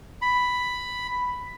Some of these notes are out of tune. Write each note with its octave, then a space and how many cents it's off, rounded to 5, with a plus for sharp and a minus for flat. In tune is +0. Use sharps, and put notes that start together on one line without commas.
B5 +5